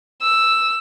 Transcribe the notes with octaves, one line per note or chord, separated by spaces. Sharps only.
E6